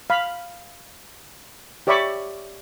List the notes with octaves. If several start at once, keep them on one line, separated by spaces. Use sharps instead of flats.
F5 B5
G4 C#5 D5 E5 B5 C#6